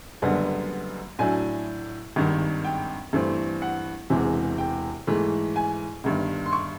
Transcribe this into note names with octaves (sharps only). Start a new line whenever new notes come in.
F#1 F#2 D3 G3 B3
A2 F#3 A3 D4 G#5
G#1 G2 D#3
G5
G2 E3 A3 C4
F#5
E1 E2 C3 E3 G#3
G5
G#2 E3 A3
G#5
G1 G2 D#3
C6
C#6